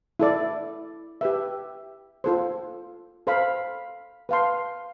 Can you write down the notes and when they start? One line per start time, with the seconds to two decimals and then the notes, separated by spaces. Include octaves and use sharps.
0.19 E4 A4 D5
1.21 G4 B4 E5
2.24 F4 A4 C5
3.27 A4 C5 F5 B5
4.29 B4 F5 A5 C6